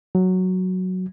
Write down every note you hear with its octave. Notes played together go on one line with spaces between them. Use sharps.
F#3